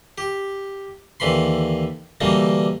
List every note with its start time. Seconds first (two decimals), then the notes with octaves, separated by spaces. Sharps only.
0.18 G4
1.20 D#2 D3 E3 B5 C6
2.21 B2 D3 E3 G3 A#3